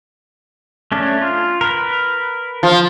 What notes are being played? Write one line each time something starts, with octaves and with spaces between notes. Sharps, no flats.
A3 C#4 D4
F4
A#4 B4
F3